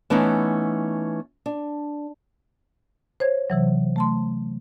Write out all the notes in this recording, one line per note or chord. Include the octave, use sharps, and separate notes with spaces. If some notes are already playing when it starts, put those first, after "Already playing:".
E3 A3 B3 C#4 D#4
D4
C5 C#5 G#6
C3 E3 F#3
A3 A5 C6